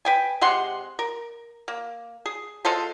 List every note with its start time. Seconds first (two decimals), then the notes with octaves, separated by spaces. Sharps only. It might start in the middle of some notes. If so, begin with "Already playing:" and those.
0.05 B4 G5 G#5
0.41 C3 G#3 F#5 C6
0.99 A#4
1.68 A#3
2.26 G#4
2.65 G#3 F4 A4 C5